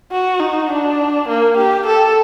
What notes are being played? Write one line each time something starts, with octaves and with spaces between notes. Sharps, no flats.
F#4
D#4
D4
A#3
G4
A4